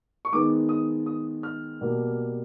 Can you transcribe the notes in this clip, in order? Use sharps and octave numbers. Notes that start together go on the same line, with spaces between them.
C#6
D#3 G#3 B3 D6
D#6
D#6
F6
B2 G3 A#3